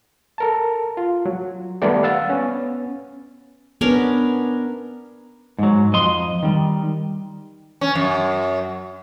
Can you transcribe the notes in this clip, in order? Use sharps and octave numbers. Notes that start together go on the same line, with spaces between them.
A4 A#4 A5
F4
F#3
D#3 G3 A3 B3 D5
F5 F#5 E6 A6
B3 C#4
B3 C#4 D4 A#4
G#2 F#3
F2 D#5 C6
D#3 G3
C#4
F#2